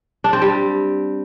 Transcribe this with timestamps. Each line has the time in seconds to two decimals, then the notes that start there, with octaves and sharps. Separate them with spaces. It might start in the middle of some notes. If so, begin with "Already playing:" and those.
0.24 D4
0.33 C4
0.42 G3